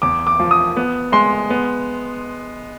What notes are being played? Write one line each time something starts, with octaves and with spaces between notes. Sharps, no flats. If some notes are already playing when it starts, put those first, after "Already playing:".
E2 D6
D6
F3
D#6
B3
G#3 C6
B3